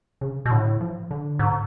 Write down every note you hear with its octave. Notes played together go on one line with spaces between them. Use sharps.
C#3
B2
A2 D3
F3
D3
G#2